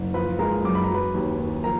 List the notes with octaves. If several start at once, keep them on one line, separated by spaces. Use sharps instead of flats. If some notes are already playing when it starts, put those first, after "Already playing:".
Already playing: F#1
F3 B4 B5
G#3 A#4 A#5
F#2 D6
B5
A#5
F#3 B4 B5
D#2
D#2
F3 A#4 A#5